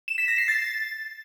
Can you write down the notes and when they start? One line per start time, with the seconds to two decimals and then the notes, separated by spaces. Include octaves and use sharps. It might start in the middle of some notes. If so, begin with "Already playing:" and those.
0.08 E7
0.18 B6
0.28 A#6
0.38 C7
0.48 A6